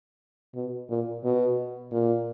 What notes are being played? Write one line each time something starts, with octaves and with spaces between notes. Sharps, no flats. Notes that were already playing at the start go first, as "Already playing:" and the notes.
B2
A#2
B2
A#2